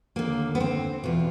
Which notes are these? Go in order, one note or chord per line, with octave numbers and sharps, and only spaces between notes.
D#2 D3 A#3
B3
C4
E2 B2 F4